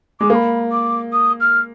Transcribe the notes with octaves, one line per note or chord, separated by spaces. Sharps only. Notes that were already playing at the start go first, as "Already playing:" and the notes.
G#3 D6
A#3 B5 D6
D6
D#6
F6